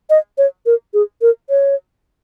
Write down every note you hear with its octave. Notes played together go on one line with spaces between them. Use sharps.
D#5
C#5
A#4
G#4
A#4
C#5